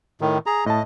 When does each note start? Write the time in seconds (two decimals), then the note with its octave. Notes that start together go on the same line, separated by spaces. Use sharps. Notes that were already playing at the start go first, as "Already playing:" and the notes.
0.21 A2 D#3
0.46 G#4 A#5
0.66 A2 D#5 A5